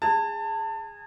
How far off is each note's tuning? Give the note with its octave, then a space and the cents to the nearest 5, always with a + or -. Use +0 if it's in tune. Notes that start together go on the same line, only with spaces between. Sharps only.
G#4 -15 A5 +25